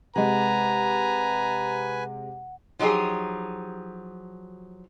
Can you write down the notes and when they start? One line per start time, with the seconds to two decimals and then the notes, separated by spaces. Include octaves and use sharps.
0.16 C3 G#3 B4 F#5 G#5 A#5
2.79 F3 F#3 D#4 G4 G#4